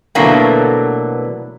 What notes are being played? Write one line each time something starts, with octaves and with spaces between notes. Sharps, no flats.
B2 D3 E3 F#3 A3 A#3